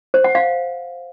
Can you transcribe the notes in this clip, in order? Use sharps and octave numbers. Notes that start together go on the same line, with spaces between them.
C5
F#5
F5